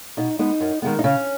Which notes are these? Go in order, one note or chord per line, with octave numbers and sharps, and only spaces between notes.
B2 D#4
G#3 B3 D#4
F#2
D#3 G#3 B3
D#4
C#3 C#4